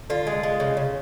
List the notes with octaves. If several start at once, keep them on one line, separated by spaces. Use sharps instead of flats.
D3 F4
G#3
G#3
C#3
C#3